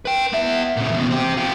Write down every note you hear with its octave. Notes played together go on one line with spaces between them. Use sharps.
B4 G5
B3 E5
A#2 C#3
E2 B2
C4 G4
F4 G4